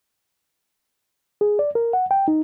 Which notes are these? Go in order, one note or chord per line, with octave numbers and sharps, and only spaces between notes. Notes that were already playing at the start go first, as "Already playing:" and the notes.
G#4
D5
A#4
F#5
G5
D#4